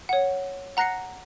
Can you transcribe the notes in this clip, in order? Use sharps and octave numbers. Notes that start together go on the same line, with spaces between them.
C#5 F#5
F#5 A#5 F#6 A#6 C7 C#7